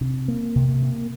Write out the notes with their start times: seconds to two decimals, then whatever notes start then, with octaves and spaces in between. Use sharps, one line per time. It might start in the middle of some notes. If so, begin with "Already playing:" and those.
0.01 C3
0.28 A#3
0.55 C3
0.83 A#3